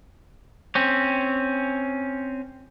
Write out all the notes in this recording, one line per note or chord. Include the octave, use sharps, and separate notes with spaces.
C4 C#4